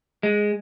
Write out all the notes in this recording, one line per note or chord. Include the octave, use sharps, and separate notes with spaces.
G#3